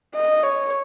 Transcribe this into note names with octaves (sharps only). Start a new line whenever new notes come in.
D#5
C#5